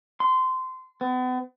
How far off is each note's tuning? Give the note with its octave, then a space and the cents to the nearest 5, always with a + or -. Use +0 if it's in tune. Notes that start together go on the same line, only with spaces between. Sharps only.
C6 -20
B3 +40